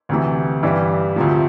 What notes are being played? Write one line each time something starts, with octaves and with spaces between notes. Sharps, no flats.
D2 C3 E3
G2 E3 G3
D2 C3 F3